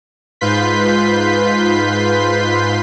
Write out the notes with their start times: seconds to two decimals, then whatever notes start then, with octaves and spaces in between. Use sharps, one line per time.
0.41 G#2 F4 B4 C6 G6 B6